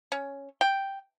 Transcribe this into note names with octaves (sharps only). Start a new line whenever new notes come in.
C#4
G5